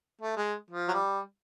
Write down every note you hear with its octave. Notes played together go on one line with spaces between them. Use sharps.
A3
G#3
F3
F#3
G3